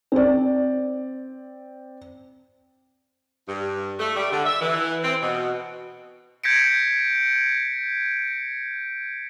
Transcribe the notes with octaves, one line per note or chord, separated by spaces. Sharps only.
C4 D5
G2
A3
G3
D3
E5
E3
C4
B2
G6 G#6 A#6 B6 C#7 D7